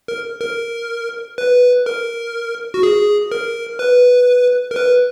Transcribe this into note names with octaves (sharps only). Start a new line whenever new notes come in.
A#4
A#4
B4
A#4
F#4
G#4
A#4
B4
A#4
B4